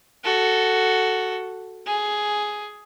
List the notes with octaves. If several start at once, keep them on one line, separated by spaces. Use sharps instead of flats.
F#4 A4
G#4